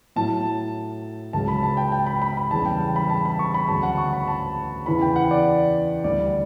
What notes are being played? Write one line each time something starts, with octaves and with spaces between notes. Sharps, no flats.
A2 F#3 A5
C#2 C#3 F#3 A5
B5
A5
G5
G5
B5
B5
B5
E2 C#3 G3 A5
G5
B5
A5
B5
C#6
B5
D2 C#3 F#3 A5
F#5
C#6
B5
A5
E2 C#3 E3 B5
G5
F#5
D5
D2 D3 G3 D5